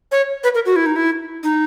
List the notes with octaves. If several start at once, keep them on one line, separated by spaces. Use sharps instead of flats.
C#5
B4
A#4
F#4
E4
D#4
E4
D#4